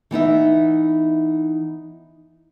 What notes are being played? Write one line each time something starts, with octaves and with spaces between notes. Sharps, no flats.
E3 B3 D#4 E5